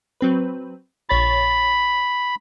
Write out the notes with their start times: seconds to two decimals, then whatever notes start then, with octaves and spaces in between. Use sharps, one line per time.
0.21 F#3 C4 B4
1.09 A#1 C#5 B5 A6